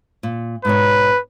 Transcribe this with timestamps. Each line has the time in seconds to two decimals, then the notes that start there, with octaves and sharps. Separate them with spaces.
0.23 A#2
0.65 G#2 B2 B4 C#5